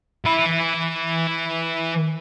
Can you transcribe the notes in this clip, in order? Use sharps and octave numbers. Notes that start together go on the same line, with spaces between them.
E3 B5